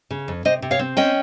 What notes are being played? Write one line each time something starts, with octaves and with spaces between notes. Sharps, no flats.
C#3
F2
C3 C5 D#5
C3
C#5 F5
C4
C#4 D#5 G5